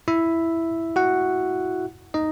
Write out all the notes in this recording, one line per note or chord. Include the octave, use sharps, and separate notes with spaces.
E4 E5
F#4 F#5
D#4 D#5